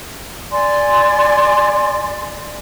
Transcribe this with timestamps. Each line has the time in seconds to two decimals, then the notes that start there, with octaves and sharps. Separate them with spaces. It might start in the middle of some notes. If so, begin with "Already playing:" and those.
0.52 D5 G#5 C6